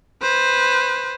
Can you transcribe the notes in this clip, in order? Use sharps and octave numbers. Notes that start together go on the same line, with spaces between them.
B4 C5